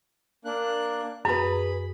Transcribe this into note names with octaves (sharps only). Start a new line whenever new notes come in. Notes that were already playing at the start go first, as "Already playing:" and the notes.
A#3 D4 F#6
F#2 G#4 B4 B5